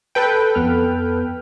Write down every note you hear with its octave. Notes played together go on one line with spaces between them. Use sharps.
A4 B4 G5
F2 B3 F6